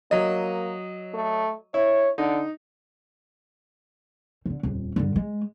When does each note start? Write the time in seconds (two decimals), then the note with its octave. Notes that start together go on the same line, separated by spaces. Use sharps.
0.11 F#3 A#3 D#5
1.14 A3
1.74 E4 C#5
2.18 D3 D#4
4.46 D3 D#3
4.63 D#1 F2
4.96 G2 D3
5.16 G#3